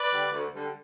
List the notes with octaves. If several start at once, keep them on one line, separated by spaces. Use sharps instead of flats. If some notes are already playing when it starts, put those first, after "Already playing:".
Already playing: B4 D5
D3 G3
D2
D3 G3